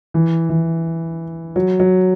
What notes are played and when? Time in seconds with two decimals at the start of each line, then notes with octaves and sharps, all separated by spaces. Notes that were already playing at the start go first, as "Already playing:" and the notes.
0.14 E3
0.49 E3
1.56 F#3
1.80 F#3